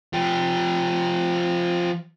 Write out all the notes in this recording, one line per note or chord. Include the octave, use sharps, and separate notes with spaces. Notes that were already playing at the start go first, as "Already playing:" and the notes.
F3 G4